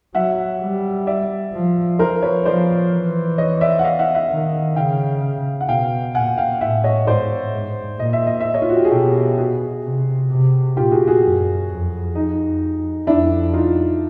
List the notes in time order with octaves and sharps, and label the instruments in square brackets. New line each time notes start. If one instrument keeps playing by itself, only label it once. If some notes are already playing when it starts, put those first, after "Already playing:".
[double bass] F#3 [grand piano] E5 F#5
[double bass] G3
[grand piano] D5 E5
[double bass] F3
[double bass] F3 [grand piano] A#4 C5
[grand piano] B4 C#5
[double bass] F3 [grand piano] C5 D5
[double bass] E3
[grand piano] C#5 D#5
D5 E5
F#5
D#5 F5
E5 F#5
E5 F#5
[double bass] D#3
[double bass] C#3 [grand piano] F5 G5
[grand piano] F#5
[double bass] B2 [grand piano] F5 G5
[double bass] A#2 [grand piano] F#5 G#5
[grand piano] F5 G5
[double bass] A2 [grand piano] E5 F#5
[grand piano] C#5 D#5
[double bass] G#2 [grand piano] C5 D5
[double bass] G#2
[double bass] A#2 [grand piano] D#5
[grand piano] E5
D#5
E5
C#5 D#5
F4
F#4
G4
G#4
[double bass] B2 [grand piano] G4 A4
[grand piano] F#4 G#4
[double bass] C3
C3
[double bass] A#2 [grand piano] F4 G4
[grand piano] F#4 G#4
F#4 G#4
[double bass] F#2
F2
[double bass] F2 [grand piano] D#4
[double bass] F2 [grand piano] D4 E4
[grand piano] D#4 F4